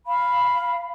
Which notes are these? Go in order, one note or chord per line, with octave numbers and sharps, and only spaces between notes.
F5 B5